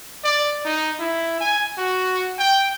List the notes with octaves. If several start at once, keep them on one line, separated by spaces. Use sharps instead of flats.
D5
D#4
E4
G#5
F#4
G5